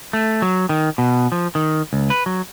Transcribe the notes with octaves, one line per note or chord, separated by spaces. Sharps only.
A3
F#3
D#3
B2
F3
D#3
C#2
B4
F#3